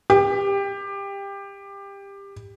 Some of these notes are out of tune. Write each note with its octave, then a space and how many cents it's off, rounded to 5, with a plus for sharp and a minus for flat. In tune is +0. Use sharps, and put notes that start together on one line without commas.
G4 +20